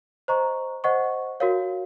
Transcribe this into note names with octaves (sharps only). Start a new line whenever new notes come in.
C5 D#5 A#5 C#6
C5 D#5 F#5 C#6
F#4 A#4 C#5 F5